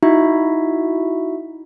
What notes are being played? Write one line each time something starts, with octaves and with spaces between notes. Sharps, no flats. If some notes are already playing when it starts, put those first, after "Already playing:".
D#4 E4 F#4 E5